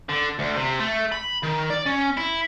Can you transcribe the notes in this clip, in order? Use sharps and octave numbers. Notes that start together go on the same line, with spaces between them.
D3
D2
C3
A3
B5
D#3
D5
C#4
E4